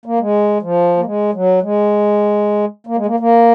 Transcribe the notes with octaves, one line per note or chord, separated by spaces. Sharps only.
A#3
G#3
F3
A#3
G#3
F#3
G#3
A#3
G#3
A#3
A#3